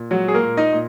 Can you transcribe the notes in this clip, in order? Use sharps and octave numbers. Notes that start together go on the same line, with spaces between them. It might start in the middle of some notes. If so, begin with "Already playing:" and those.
Already playing: A#2
F#3 G#3 F#4
G#4
A#3 A#4
A#2
D#4 D#5
A#2